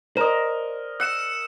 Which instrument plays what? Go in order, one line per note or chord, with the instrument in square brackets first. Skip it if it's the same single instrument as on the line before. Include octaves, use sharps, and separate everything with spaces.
[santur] A#4 D#5 [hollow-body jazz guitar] C5 D5
[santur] F#5 [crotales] E6 C#7 E7